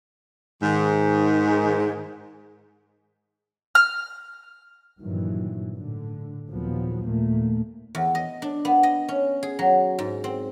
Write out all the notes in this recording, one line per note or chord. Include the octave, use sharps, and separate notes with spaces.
G#2 D#3
F6
G2 A#2 D#3 E3 F#3
A2 D3
D#2 A#2 F3 F#3 B3
D#2 A#2 A3 A#3
E2
D#5
D4
B3
D#5
C#4
G#4
F#3
G#2
C4